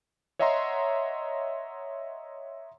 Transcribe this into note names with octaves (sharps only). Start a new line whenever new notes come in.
C#5 D#5 E5 F#5 A#5 C6